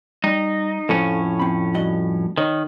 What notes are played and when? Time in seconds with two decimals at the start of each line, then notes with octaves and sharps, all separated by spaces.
0.24 G3 D#4
0.89 F2 A2 C#4 A4 C5 F5
1.39 C4 B5
1.74 G2 F#4 D#5
2.37 D#3 A#4 C#5 D#5